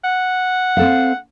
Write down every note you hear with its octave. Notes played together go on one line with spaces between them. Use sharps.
F#5
C4 A4 F5